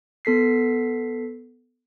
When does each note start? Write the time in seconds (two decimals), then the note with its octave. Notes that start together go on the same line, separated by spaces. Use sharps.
0.25 B3 A4 B6 C7